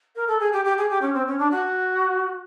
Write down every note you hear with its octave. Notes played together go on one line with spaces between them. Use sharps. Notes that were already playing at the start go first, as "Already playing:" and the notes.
A#4
A4
G#4
G4
G4
G#4
G4
C#4
C4
C#4
D4
F#4